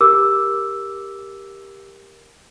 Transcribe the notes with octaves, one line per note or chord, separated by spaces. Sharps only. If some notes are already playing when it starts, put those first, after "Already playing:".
G4 A#4 D6 E6